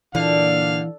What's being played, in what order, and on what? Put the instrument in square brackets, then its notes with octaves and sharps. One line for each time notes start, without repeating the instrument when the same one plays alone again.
[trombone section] A#2 D4 [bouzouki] D3 [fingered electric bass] E3 [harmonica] F5